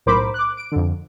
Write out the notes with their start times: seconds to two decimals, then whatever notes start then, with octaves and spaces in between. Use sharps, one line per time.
0.06 B1 A2 A#4 C5 B5 D6
0.34 D6 F#6
0.57 D7
0.72 F2 D3